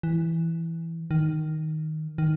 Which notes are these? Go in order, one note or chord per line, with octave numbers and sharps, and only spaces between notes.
E3
D#3
D#3